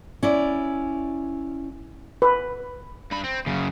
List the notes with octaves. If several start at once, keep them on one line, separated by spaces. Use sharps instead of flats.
C#4 E4 D5
B4
G2 B5
C4
F#2 C#3